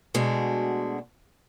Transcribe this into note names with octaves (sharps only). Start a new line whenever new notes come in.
B2 G#3 A3 D4 F#4